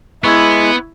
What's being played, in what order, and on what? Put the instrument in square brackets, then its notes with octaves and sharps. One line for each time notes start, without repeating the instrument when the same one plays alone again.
[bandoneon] G#3 [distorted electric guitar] B3 [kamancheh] E4 [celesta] C#6 E6 G#6